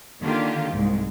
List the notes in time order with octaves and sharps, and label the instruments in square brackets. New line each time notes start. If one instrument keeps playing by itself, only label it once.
[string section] D3 D#3 A#3 F4 G4
C2 G#2